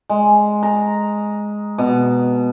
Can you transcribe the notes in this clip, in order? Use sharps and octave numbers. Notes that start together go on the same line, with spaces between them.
G#3
A#5
B2